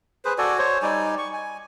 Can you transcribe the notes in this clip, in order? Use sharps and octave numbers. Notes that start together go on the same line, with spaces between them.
G#4 B4 C5
F#4 A4 D5 G#5
C5 C#5
G3 D#4 D5 G#5
C#6
G#5